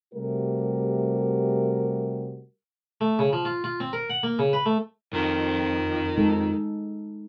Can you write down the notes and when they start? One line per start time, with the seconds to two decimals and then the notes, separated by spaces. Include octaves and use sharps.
0.14 C3 G3 A3 F#4 A#4
3.01 A3
3.19 C#3
3.33 F3
3.45 F4
3.64 F4
3.80 C4
3.93 A#4
4.10 F#5
4.23 A#3
4.39 C#3
4.53 B4
4.66 A3
5.13 F2 D#3
6.18 G#3 D#4 A4